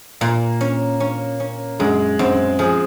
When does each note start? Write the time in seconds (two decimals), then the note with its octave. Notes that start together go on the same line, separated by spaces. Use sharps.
0.21 A#2 A#3
0.61 C#4
1.00 C#4
1.40 C#4
1.80 F#2 G#3
2.19 F#2 C4
2.59 F3 G#4